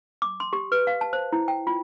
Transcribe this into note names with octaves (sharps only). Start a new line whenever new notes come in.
D6
C6
G4
B4
F5
A5
C5
E4
G5
F4